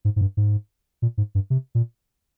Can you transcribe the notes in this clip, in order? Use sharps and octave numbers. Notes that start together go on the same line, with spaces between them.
G#2
G#2
G2
G#2
A#2
G#2
G2
C3
A#2